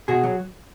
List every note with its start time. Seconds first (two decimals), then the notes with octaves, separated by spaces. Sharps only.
0.08 B2 F#4 G#4
0.23 F#3